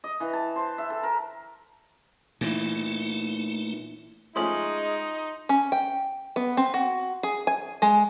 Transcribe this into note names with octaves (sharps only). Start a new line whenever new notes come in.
D#5
E3
A5
C5
E5
A4
A#4
A#2 E3 A3 D#4
F3 G#3 A3 C#4 D#4 C6 D#6 F#7
C#4
G5
B3
C4
F#4
G#4
G#5
G#3